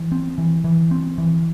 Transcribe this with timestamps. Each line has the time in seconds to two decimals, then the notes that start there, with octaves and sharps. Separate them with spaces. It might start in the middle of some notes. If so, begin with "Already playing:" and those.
Already playing: E3
0.12 C4
0.38 E3
0.64 E3
0.91 C4
1.18 E3